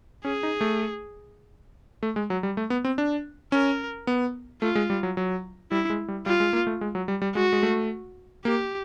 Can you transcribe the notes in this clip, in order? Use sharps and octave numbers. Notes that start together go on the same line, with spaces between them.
C#4 G#4
D#4
A3
A3
G#3
F#3
G3
A3
B3
C4
D4
C#4 A#4
B3
A3 F4
G#3
G3
F#3
F#3
G3 E4
G#3
G3
G3 F4
G#3
A#3
A3
G#3
F#3
G3
G3
G#3 F#4
G#3
A3
A#3 G4